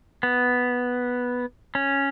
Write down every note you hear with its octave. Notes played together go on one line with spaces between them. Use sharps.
B3
C#4